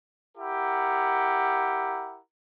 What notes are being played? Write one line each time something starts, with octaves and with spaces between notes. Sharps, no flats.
E4 G4 A#4 F#5